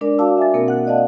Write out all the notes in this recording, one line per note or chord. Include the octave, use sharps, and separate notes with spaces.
G#3 D4 A#4 D5
F#4 D5 F5 A5 D6 E6
E5 G#5 D6 A6
B2 A#3 C4 A#4
F#5 F#6
D5 D#5 F5 F#5 A5